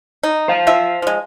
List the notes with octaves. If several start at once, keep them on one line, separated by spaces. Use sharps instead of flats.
D#4
C5 F5
F3 F4 E5
F3 G#3